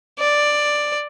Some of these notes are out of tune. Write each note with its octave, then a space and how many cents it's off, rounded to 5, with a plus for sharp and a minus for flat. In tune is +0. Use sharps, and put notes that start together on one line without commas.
D5 +5